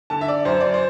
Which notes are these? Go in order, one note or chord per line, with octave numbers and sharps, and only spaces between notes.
D3 A5
E5
D5
F#2 C5
D5
C5